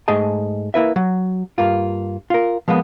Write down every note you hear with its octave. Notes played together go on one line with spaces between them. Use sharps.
G#2 A3 G#4 D#5 A5
A#3 E4 B4 E5
F#3
G2 A#3 F4
F4 A#4
F3 G#3 A#3 B3